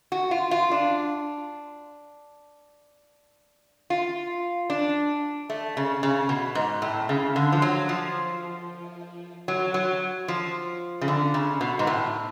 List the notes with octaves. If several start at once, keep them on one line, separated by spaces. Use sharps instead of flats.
F#4
F4
F4
D4
F4
D4
A3
C#3
C#3
B2
G#2
A2
C#3
D3
F3
F#3
F3
F#3
F#3
F3
C#3
D3
C#3
B2
G#2
A2